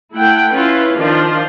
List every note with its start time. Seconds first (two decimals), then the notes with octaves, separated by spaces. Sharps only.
0.17 A3 E4 F#5 G5
0.53 C#4 E4 F4 B4
0.98 D#3 F3 D4 F4 C5